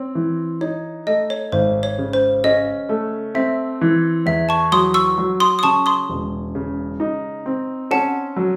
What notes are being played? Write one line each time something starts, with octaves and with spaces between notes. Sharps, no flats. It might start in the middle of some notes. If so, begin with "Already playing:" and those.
Already playing: C4 C#5
E3
D#4 C#5
A3 D#5
C#5
G#1 C5
C#5
C#3
C5
C#4 D#5
A3
C4 E5
E3
E2 E5
A5 C#6
F#3 C6 D#6
C#6 E6
F#3
C6 D#6
D#6
C#3 A5 C#6
C6 D#6
E1
C#3
D#4
C4
C#4 F#5 A5
F#3